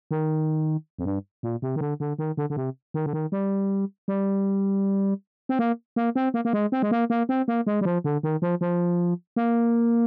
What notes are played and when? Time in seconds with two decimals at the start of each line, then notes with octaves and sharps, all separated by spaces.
0.11 D#3
0.99 F2
1.05 G2
1.43 A#2
1.62 C3
1.76 D#3
1.81 D3
2.00 D3
2.19 D#3
2.37 D3
2.50 D3
2.56 C3
2.94 D#3
3.06 D3
3.13 D#3
3.32 G3
4.08 G3
5.49 C4
5.59 A#3
5.96 A#3
6.16 C4
6.34 A#3
6.45 A#3
6.53 G#3
6.72 C4
6.82 G#3
6.91 A#3
7.10 A#3
7.29 C4
7.48 A#3
7.67 G#3
7.81 G3
7.85 F3
8.04 D3
8.23 D#3
8.42 F3
8.61 F3
9.36 A#3